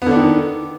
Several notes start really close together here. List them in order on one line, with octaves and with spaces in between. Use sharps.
B3 D3 D4 D#3